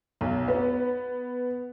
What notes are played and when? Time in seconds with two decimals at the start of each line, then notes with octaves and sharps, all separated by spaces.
0.21 B1
0.48 B3